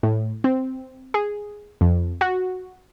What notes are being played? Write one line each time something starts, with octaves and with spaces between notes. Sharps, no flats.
A2
C4
G#4
F2
F#4